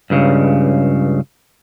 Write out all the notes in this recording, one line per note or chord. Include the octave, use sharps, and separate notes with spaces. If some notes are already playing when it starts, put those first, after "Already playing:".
C#2 G2 C#3